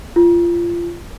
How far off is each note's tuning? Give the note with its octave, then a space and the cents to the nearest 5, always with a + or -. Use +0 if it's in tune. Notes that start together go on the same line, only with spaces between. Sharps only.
F4 -25